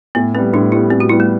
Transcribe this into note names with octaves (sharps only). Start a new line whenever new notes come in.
A2 B3
G3 B3 C4
A2 D4
G3 B3 E4
A2 C4
F#4
G3 B3 E4
A3